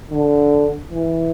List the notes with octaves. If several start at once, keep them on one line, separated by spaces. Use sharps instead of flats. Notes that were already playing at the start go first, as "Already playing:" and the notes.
D3
E3